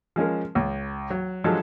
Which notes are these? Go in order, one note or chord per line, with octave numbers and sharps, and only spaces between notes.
F3 G#3 C#4 A#4
C#2
F#3
F3 F#3 G#3 D4 G4 A4